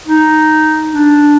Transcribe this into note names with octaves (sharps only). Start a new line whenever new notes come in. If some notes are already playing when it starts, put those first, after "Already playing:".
D#4
D4